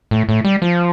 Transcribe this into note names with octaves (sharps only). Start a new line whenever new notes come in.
A2
A2
G3
F3